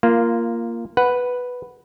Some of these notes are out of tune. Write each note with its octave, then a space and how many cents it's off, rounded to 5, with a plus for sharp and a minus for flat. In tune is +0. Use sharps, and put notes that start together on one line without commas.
A#3 +0 F4 -15
B4 +0 F#5 +0